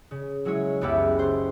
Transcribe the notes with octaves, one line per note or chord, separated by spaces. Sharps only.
C#3
F#3 G#3 E4 C#5
F#1 C#2 B3 G4 B4 E5
C5